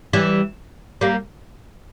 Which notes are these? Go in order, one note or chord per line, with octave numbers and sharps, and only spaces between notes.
E3 G3
G3 A#3